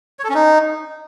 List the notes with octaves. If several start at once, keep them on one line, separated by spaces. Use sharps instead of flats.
C#5
A4
C#4
D#4